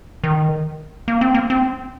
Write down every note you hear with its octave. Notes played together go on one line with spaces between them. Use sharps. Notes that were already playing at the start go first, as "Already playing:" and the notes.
D#3
A#3
C4
A#3
C4